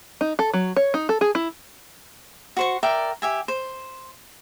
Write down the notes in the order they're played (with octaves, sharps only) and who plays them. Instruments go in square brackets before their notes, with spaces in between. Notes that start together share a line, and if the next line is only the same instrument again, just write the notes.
[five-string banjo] D#4
A4
F#3
C#5
D#4
A4
G#4
E4
[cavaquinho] F#4 C5 C#6
A#4 D5 E5 G5
G4 E5 G#5
C5